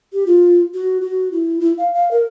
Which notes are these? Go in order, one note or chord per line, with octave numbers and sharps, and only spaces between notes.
G4
F4
F#4
F#4
E4
E4
F5
F5
A#4